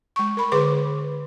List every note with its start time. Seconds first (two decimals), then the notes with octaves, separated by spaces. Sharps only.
0.16 G#3 C#6
0.37 A#4 B5
0.52 D3 G#4 B4 C6 D6